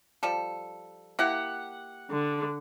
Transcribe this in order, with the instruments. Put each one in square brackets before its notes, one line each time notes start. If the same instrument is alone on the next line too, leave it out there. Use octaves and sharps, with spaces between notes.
[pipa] F3 G3 A4
[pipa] A#3 E4 G4 [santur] F#5
[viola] D3